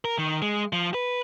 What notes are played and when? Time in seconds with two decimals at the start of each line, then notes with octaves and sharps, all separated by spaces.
0.05 A#4
0.18 D#3
0.42 G#3
0.73 F3
0.94 B4